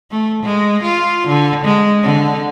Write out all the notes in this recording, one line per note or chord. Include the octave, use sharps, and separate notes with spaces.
A3
G#3
F4
D3
G#3
D3